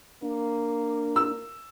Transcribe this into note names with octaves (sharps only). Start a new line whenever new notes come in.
A#3 D4
E6